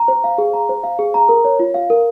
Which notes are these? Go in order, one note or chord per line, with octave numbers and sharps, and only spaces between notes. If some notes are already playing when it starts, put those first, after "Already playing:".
Already playing: A#5
C5
F5
G#4
A#5
C5
F5
G#4
A#5
A#4
C#5
F4
F5
A#4